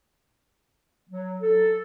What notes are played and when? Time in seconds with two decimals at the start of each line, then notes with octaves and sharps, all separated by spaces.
1.10 F#3
1.42 A4